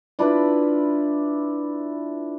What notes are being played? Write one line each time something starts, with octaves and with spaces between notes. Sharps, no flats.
D4 E4 F4 B4